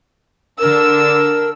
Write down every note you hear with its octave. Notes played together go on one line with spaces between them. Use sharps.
D3 D4 A#4 E6